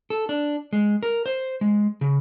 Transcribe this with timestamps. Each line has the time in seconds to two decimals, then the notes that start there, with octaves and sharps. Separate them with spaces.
0.10 A4
0.29 D4
0.73 G#3
1.03 A#4
1.26 C5
1.61 G#3
2.01 C#3